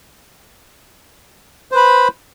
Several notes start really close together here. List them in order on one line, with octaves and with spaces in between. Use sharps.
C5 B4 B5